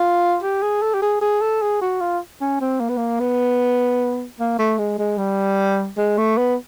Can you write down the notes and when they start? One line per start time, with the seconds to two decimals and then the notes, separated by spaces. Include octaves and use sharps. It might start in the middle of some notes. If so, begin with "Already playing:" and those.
Already playing: F4
0.43 G4
0.62 G#4
0.82 A4
0.94 G4
1.02 G#4
1.21 G#4
1.41 A4
1.62 G#4
1.81 F#4
2.01 F4
2.41 C#4
2.61 C4
2.80 A#3
2.89 B3
2.97 A#3
3.20 B3
4.39 A#3
4.59 A3
4.78 G#3
4.99 G#3
5.18 G3
5.97 G#3
6.18 A3
6.37 B3